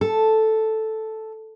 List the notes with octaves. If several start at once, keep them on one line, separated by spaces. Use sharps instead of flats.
A4